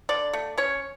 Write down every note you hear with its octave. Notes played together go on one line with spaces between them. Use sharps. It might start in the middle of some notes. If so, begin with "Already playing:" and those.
D3 D5
A3
C#4 C#5